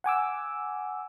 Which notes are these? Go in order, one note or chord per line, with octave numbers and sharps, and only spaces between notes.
F#5 G#5 D6 E6